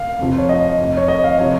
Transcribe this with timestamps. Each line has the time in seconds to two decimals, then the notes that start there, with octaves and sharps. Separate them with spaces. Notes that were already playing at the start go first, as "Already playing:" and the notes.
Already playing: F5
0.19 F2 C3 F3
0.38 C#5
0.49 D#5
0.79 F1 F2 C3
0.97 C#5
1.08 D#5
1.24 F5
1.39 C3 F3 C#5